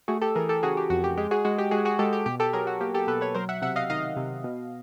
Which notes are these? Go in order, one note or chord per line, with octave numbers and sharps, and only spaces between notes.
A3 F#4 G#4
G4 A4
E3 G#4 A#4
G4 A4
C#3 F#4 G#4
G4
F2 F#4
G4
G#3 G4
F#4 G#4
G#3 F#4
G4
G#3 F#4 G#4
F#4 G#4
G#3 G4 A4
G4
B2 G4
G4 A4
F#3 G#4 A#4
F#4
A#3 G4
G4 A4
B2 A4 B4
B4 C#5
F#3 A#4 C5
E5 F#5
C3 E5 F#5
D#5 F5
D#3 D#5 F5
C3
B2